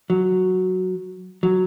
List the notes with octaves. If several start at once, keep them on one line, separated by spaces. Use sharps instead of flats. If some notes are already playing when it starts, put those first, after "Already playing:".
F#3
F#3